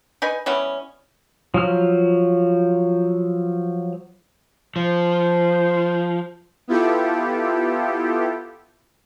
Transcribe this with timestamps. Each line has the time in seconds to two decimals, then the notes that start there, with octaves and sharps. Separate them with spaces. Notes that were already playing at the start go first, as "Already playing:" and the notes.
0.22 D#4 B4 G#5
0.46 E3 G3 B3 C#4
1.54 F3 F#3 F6
4.76 F3 C5
6.68 B3 E4 F4 G4 A4